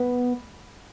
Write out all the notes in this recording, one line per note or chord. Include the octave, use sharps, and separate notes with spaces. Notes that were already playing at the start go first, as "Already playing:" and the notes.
Already playing: B3